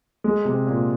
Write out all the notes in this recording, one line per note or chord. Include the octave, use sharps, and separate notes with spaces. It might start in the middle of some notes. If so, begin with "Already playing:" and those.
G#3
C3
A#2